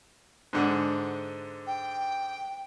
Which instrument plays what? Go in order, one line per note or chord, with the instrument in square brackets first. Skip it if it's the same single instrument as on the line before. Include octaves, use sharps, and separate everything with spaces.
[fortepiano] G#2 D3 F#5
[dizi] G5